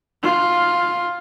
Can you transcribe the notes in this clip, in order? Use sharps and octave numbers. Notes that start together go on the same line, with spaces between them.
F4